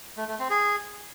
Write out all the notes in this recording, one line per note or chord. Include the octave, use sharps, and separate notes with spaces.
A3
A3
C4
G#4